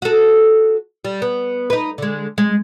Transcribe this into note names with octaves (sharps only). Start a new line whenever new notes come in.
F#4 A4
G3
B3
D#4 B4
D3 G#3
G#3